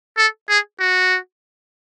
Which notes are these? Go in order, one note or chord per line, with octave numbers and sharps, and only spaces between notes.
A4
G#4
F#4